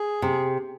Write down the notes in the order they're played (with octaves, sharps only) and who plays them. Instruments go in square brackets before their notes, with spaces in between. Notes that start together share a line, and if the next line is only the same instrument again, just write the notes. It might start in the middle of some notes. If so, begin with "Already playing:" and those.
Already playing: [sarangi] G#4
[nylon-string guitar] C3